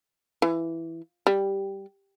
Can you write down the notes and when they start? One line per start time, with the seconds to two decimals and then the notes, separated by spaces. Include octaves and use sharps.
0.42 E3
1.27 G3